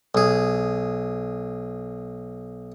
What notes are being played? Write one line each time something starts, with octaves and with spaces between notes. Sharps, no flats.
B1 G#4